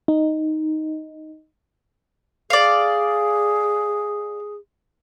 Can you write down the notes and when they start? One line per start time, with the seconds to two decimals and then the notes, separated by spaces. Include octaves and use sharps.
0.08 D#4
2.50 G#4 D5 F5